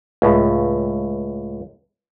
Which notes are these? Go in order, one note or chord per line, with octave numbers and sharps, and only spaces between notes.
C#2 A2